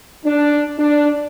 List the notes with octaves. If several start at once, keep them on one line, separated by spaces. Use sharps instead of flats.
D4
D4